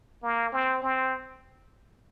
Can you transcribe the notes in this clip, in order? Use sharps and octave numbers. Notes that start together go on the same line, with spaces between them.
A#3
C4
C4